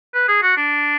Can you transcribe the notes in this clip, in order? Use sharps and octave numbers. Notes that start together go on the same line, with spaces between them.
B4
G#4
F#4
D4